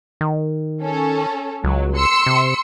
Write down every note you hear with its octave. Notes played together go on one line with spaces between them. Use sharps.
D#3
C#4 A4
C#2 F#3
C6 E6 C#7
C3